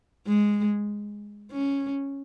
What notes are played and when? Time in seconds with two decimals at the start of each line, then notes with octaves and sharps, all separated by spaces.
0.27 G#3
1.52 C#4